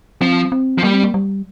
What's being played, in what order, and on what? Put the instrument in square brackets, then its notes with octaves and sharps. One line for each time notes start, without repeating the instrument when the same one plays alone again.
[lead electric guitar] F3 [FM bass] C4
[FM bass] C4
[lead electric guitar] F3
[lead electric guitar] G3 [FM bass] A#3
[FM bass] C4
A#3
G3